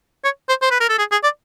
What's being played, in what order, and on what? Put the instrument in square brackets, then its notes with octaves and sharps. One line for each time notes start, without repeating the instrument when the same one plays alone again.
[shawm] C#5
C5
C5
B4
A#4
A4
G#4
G#4
D5